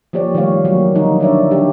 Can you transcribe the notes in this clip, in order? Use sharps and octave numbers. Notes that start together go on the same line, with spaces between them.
F3 A#3 G4 C#5 D5
D#3 G3 A3 C#5 F5
F#3 A#3
D3 F3 D#4
D4 C#5 D5 E5
D4 G4